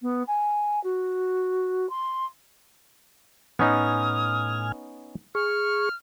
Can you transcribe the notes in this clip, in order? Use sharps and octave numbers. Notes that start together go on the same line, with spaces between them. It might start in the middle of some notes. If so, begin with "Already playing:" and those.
B3
G#5
F#4
C6
A2 B3 C#4 D#4 G#5 D#6 F6
G#4 C#6 F6